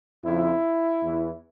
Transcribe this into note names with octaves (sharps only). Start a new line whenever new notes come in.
F2 C#3 F3 E4
E2 E3